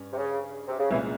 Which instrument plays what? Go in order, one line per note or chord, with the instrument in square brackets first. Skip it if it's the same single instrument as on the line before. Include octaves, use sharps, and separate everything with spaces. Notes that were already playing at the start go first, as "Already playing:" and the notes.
Already playing: [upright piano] G2 G3 C#4
[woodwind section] C3
C#3
C3
C#3
[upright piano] C2 A#2 G#3 C#4 [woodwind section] E3